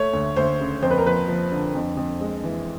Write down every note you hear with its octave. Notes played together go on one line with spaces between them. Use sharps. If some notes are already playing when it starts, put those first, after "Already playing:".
Already playing: A3 C#5
D2
D2 C5
C#3
F2 C5
B4
A#4
F3 B4
F3
D3
F2
F2
G#3
E3